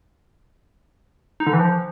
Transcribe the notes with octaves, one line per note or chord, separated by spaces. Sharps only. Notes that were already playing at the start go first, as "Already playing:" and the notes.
D#4
D3
E3
F3